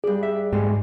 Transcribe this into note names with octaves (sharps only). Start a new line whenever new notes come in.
G2 G#4 D5
E5
G#2 G#3 A3 G4